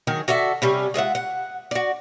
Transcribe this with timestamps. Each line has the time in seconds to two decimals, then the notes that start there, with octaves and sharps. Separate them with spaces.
0.07 D#3 F#3 G#4
0.28 F#4 A4 D5 E5
0.62 C3 G3 C#4
0.94 G#3 F4 E5 F#5
1.15 F#5
1.71 F#4 D5